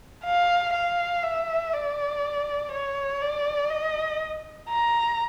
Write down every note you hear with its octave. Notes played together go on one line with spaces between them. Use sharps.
F5
F5
E5
D5
C#5
D5
D#5
A#5